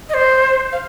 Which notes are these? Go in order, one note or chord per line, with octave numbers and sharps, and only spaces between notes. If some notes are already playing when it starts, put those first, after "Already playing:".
D#5
C5
F5